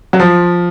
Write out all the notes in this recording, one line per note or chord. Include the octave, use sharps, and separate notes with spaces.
F#3
F3